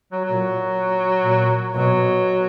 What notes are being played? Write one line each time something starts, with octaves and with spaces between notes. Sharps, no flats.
F#3
A#2 F#3
A#2
B2 F#3